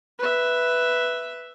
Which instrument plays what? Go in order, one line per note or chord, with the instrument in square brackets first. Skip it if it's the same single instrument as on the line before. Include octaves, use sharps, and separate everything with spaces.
[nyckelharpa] B4 E5